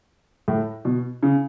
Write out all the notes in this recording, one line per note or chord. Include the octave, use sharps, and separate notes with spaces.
A2
B2
C#3